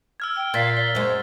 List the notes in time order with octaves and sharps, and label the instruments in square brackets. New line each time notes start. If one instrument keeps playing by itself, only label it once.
[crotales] E6 F6 G#6
[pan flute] G5 [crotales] F6 G7
[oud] A#2 [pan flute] F5 [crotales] G#6 A6 B6
[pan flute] D5 [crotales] G7
[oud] F#2 G#3 [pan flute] C5